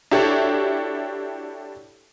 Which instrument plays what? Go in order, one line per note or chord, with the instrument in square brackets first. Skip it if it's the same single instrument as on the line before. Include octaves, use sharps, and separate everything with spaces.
[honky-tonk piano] D4 E4 F#4 G4 A4 C#5